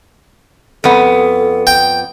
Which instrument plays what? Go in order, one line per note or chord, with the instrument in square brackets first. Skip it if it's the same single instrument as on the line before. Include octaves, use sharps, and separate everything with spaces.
[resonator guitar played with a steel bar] F2 B3 [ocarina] A4
[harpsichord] G5